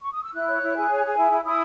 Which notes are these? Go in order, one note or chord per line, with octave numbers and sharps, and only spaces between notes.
C#6
D#6
E6
E4 F#6
C#5
E4
G#4
C#5
G#4
E4
E4
E4 D#6